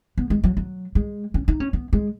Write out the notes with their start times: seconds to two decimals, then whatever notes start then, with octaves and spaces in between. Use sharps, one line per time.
0.18 B3
0.30 G#3
0.44 F#3
0.57 F#3
0.95 G#3
1.34 C#4
1.48 D#4
1.60 C#4
1.73 B3
1.93 G#3